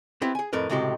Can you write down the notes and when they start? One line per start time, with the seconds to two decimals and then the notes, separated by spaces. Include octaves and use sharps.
0.22 B3 C4 E4 G4
0.35 G#4 G#5
0.53 F2 A2 A#4 B4
0.69 C#2 A2 C3 G#3 F#4 G4